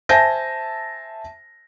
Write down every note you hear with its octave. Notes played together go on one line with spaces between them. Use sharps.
C5 E5 G#5 A5 G6 A#6